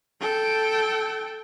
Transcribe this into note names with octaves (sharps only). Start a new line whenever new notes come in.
A4 G5